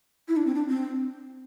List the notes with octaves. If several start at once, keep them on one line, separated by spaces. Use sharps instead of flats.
E4
D4
C4
D4
C4